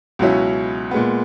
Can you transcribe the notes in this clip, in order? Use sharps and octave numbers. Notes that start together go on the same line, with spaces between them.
C#2 B2 F#3 C#4 E4
A#2 G#3 B3